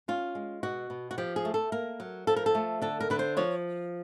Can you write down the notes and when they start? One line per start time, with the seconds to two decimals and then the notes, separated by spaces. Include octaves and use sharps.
0.08 C#4 F4
0.35 G#3
0.63 B2 F#4
0.90 B2
1.11 F#4
1.18 F3 G4
1.36 G#4
1.45 A3
1.54 A4
1.72 A#3 A#4
2.00 F#3
2.27 F3 A4
2.36 A#4
2.46 A4
2.55 A3
2.82 D3 A4
3.00 A#4
3.10 D3 B4
3.19 C5
3.37 F3 C#5